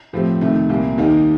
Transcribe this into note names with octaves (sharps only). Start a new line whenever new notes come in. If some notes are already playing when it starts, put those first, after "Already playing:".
A2 F3 C4 G4
C2 C3 D#3 A3
C2 A#2 G3 A#3
D#2 D#3 A#3 D#4 G4